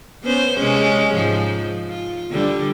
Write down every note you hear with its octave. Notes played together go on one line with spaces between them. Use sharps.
B3 C#4 C5
C3 G#3 C#4
G#2 F3
F4
D3 G3